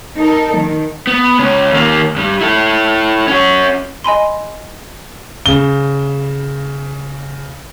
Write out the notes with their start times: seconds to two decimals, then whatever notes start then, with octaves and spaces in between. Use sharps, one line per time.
0.16 D#4 A4 A#4
0.56 D#3
1.07 B3
1.39 C#2 C#4
1.72 D#2 A#3
2.16 G2 G3
2.41 E4 A4
3.28 C#4 F#4
4.04 D#5 G#5 B5 C6
5.46 C#3 G7